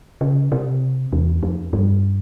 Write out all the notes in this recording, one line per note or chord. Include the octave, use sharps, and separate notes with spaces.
C#3
C3
E2
F2
G2